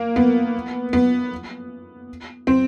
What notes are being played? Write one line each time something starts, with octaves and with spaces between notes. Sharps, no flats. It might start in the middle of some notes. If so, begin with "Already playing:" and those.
Already playing: A#3
B3
B3
C4